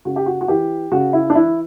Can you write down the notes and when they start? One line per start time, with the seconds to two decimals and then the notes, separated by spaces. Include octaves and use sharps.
0.05 C#3 F#4
0.16 G4
0.26 F#4
0.41 F#4
0.48 E3 G4
0.92 C#3 F#4
1.13 E4
1.30 D4
1.35 E3 E4